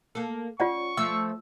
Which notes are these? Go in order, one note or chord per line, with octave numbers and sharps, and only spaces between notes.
A#3 A4
C#4 F4 D5 F#5 C#6
F3 A3 E6